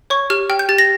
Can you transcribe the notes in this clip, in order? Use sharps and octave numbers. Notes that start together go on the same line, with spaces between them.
C#5 C#6
G4 F6
G5 F6
G6
G4 A6
A#6